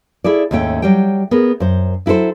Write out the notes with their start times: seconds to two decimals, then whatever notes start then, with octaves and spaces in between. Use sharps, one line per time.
0.24 E4 G#4 A4 D5
0.51 D#2 G#2 A3 C#4 G5
0.82 F#3 G3 G5
1.31 B3 G#4 A#4
1.60 F#2 C5
2.06 F#3 E4 F#4 A4 C5